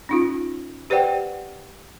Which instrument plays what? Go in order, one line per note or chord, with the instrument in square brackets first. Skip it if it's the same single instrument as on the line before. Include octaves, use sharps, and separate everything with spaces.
[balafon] C#4 D#4 F4
G4 B4 C5 D5 F#5 G5